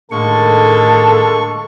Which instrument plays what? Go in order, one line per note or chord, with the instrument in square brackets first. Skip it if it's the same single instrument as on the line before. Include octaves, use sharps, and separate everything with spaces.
[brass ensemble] A2 D#3 A5 [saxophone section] D3 G#3 A#3 [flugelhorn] A4 [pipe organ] C#6